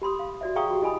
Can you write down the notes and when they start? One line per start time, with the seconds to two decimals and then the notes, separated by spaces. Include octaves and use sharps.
0.02 G4 B5 C6 D#6
0.19 F5
0.41 F#4 D5 E5
0.56 G#4 F5 G5 A#5 C#6 D#6
0.71 F#4 G4
0.82 E4 D#5 G#5 B5 D#6